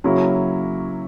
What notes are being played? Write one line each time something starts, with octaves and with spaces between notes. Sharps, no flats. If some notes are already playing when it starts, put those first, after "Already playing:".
C#3 F#3 A#3 C#4 E4